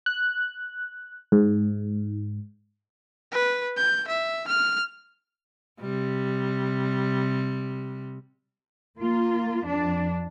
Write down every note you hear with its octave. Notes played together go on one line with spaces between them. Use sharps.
F#6
G#2
B4
G6
E5
F6
C3 G3
A#3 F4
F2 D4